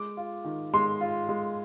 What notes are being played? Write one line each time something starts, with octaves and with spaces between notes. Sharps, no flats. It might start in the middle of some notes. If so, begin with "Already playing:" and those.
Already playing: G#3 D6
F4
D#3
G#3 C6
F4
G#3